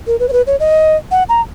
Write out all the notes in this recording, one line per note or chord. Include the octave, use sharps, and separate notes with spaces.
A#4
B4
C#5
B4
C#5
D#5
F#5
A#5